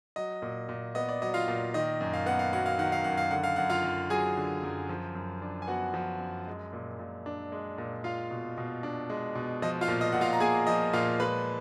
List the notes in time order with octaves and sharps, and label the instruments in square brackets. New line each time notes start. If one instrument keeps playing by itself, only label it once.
[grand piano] F#3 D#5
A#2
A#2
B3 D#5
D5
F#3 D#5
F4 F5
A#2
D#3 D#5
F#2
F5
B3 F#5
F5
F#3 F#5
F5
D#3 F#5
F5
F#2 F#5
F5
D3 F#5
F5
F#2 F#5
F4 F5
F#2
F#3 G#4 G#5
D3
F#2
F3
F#2
D4
G#5
B3 F#4 F#5
F3
F#2
G#3
A#2
A#2
D4
G#3
A#2
G#3 F4 F5
B2
B2
D4
G#3
B2
F3 D#5
F4 F5
A#2
D#5
A#2 F#5
F4 F5
A#5
A#3 G#4 G#5
F3 D#5
A#2 F4 F5
G#3 B4 B5